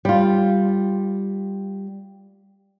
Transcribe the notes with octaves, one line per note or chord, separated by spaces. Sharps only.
G3 F4